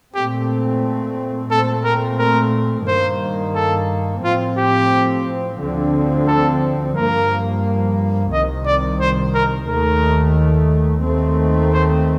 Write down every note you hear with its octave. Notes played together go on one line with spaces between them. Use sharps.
A#2 A3 C4 G4
A#2 A3 C4 A4
A#4
A#4
G2 D#3 A#3 C5
A4
A2 F3 C4 F4
G4
D2 D3 F3 C4
A4
G2 F3 A#3 A#4
C2 C3 D#3 D#5
D5
C5
A#4
D#2 D#3 A3 A#4
D#2 D#3 A3 C4
C5